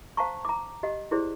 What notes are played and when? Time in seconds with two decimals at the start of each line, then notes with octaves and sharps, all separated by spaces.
0.17 C5 F5 F#5 A5 A#5 C#6
0.45 A#5 D6
0.83 G4 D#5 F#5
1.11 E4 G4 G#4 C5 D5